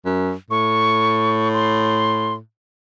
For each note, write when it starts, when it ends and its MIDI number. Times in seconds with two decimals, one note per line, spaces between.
0.05 0.33 42
0.51 2.39 45
0.51 1.48 85
1.54 2.34 84